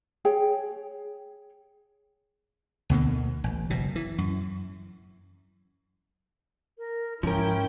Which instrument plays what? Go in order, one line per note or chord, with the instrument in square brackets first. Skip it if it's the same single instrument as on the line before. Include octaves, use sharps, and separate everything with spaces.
[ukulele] G#4 C#5 G5
[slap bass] D2 B2 D3 A#3
A1
F#1 B2
E3
F#2
[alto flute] A#4
[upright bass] G#2 [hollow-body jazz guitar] F3 A#4 [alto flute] C#4 [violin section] E4 G5